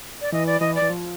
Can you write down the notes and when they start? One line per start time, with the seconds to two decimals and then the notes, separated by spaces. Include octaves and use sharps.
0.21 D5
0.32 E3 D#5
0.47 D5
0.60 E3 D#5
0.75 D5
0.82 E3
0.90 F3